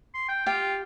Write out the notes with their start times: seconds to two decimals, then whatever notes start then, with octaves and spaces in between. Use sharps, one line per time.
0.14 C6
0.29 G5
0.46 F4 G4 G5